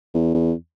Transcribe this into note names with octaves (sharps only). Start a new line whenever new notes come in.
E2
E2